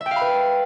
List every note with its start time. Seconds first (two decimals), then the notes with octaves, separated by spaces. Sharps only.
0.01 E5
0.06 G5
0.11 F5
0.16 B5
0.21 B4